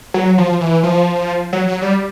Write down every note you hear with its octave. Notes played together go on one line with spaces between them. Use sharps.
F#3
F3
E3
F3
F#3
F#3
G3